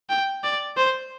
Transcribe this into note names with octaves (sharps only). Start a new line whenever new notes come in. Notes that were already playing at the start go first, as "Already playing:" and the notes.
G5
D5
C5